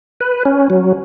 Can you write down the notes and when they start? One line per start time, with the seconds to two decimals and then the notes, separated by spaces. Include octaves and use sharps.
0.20 B4
0.45 C#4
0.70 F#3